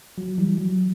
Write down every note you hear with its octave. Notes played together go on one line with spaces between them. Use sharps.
F#3
E3 G3
F#3